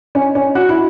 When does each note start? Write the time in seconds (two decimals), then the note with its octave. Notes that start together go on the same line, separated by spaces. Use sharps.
0.15 C#4
0.35 C#4
0.55 F#4
0.69 E4